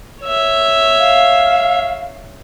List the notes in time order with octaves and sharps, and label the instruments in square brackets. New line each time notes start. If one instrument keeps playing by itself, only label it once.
[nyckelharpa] C#5 E5
[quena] F5